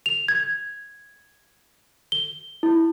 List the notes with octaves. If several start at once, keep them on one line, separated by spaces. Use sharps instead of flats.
F7
G#6
G7
E4